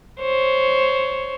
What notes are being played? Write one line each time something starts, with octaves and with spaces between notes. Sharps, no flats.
C5 C#5